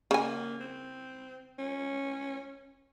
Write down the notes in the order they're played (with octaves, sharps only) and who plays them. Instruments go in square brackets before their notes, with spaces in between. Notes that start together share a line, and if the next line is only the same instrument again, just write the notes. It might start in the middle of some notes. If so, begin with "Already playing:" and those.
[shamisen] C#3 G#5 [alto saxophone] A#3
[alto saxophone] C4
C#4